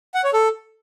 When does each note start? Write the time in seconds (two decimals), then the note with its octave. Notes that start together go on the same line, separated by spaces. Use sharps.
0.14 F#5
0.24 C#5
0.33 A4